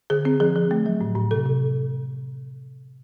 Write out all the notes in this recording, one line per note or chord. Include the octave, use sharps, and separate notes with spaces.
D3 G#4
C4
F3 G#4
F3
A3
F#3
A2
A2
C3 A4
C3